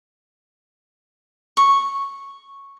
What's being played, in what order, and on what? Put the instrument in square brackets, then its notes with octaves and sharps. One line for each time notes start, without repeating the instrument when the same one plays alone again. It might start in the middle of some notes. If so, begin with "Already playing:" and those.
[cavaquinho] C#6